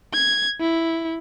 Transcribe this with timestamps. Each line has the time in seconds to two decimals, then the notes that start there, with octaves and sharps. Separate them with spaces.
0.14 G#6
0.61 E4